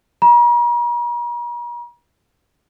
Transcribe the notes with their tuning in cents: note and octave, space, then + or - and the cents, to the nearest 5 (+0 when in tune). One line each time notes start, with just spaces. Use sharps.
A#5 +45